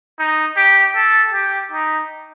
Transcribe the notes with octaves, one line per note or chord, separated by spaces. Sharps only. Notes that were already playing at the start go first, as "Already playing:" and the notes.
D#4
G4
A4
G4
D#4